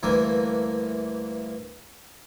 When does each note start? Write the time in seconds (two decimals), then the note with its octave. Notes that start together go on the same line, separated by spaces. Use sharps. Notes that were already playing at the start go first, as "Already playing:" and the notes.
0.03 D2 G2 E3 A#3